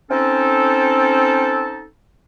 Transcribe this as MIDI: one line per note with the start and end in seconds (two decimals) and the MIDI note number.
0.10 1.84 60
0.10 1.84 61
0.10 1.84 63
0.10 1.84 69